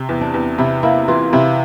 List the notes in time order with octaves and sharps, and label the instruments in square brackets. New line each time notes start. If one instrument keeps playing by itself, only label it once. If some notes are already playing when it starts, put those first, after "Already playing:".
Already playing: [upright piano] C3
E2
[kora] D4
[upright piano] E2
[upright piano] C3 [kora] E4
[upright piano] A#3 [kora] E4
[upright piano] E3 [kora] F4
[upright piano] C3 [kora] E4